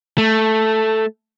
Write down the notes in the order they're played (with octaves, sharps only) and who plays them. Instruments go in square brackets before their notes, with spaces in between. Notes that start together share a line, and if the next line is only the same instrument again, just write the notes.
[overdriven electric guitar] A3